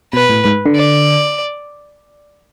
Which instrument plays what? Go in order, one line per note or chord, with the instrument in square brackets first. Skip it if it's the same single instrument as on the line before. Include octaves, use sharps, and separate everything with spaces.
[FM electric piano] B2 [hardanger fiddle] B4
[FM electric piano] A2
G#2
D3
[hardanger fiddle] D5